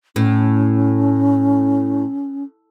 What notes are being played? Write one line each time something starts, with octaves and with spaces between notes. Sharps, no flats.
A2 C#4